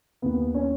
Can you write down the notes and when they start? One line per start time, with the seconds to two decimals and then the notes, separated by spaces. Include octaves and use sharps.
0.22 D#2 B3
0.54 C#4